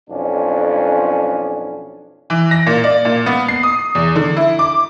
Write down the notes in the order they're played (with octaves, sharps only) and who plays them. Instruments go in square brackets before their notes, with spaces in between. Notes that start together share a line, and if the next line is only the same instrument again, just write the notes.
[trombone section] B1 F2 C#4 D4
[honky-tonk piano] E3
A#6
A#2
D5
A#2
B3
C7
D#6
E2
D3
E4
D6